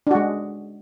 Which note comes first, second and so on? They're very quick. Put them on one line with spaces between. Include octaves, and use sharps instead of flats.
D4 F#4 G#3